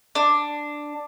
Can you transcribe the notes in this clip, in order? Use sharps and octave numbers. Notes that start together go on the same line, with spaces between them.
D4